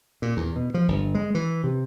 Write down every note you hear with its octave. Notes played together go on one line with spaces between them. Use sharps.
A#2
E2
B2
F3
G1
G#3
E3
C3